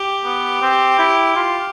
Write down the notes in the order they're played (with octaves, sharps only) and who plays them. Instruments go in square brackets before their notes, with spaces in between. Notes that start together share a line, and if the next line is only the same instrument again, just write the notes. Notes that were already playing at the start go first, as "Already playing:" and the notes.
Already playing: [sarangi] G4
[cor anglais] B3
C4
E4
F4